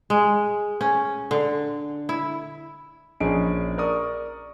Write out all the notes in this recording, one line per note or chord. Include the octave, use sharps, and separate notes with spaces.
G#3
C#4
D3
E4
A#1 C#4 D4 G#4 D#5 D7
A#4 D5 C#6 D#6